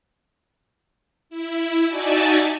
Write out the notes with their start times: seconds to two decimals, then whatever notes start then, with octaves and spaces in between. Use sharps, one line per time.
1.29 E4
1.87 D#4 F#4 D5 E5 G#5 A5